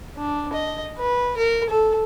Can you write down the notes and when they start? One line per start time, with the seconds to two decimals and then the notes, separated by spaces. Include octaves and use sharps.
0.17 D4
0.53 D#5
0.98 B4
1.37 A#4
1.69 A4